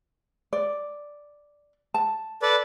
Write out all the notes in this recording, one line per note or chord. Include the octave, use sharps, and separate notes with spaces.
D5
A5
A4 B4 D5